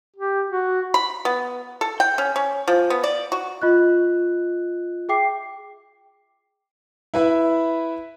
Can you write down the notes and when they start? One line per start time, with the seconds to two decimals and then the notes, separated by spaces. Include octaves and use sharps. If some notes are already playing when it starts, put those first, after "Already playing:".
0.16 G4
0.50 F#4
0.94 B5
1.25 B3
1.81 A4
2.00 G5
2.18 C#4
2.36 C#4
2.68 F3
2.90 B3
3.04 D5
3.32 F#4
3.62 F4 D#5 F#6
5.09 G#4 E5 G5 D6 C7
7.14 E4 B4 E5